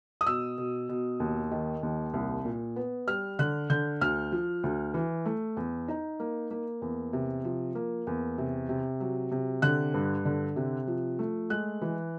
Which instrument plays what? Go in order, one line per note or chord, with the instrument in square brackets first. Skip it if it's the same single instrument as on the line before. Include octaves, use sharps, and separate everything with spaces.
[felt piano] D#6
B2 E6
B2
B2
D#2
D#3
D#2
C2
A#2
B3
G3 F6
D3 F#6
D3 G6
D2 F6
F3
D2
E3
A3
E2
D#4
A#3
A#3
E2
C3
F3
A#3
E2
C3
C3
F#3
C3
D3 F#6
G2
D3
C3
F3
A3
G#3 F#6
E3